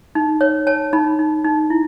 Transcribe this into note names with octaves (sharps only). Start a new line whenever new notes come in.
D#4
C#5
C#5 A5
D#4 B5
D#4
D#4
E4